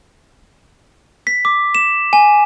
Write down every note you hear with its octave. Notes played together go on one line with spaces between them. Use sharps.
B6
D6
E7
G#5